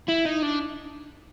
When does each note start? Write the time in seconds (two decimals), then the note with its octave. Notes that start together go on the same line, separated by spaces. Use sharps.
0.09 E4
0.26 D#4
0.43 D4